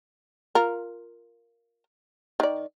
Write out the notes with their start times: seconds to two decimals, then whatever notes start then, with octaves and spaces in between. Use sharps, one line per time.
0.55 F4 A#4
2.40 D#3 D5